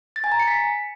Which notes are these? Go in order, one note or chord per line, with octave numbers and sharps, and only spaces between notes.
A6
G#5
A#5
C#7
B6